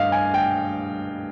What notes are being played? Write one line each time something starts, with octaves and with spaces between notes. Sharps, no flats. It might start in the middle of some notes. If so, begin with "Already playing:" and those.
Already playing: G2 D#5 F5
G#5
G5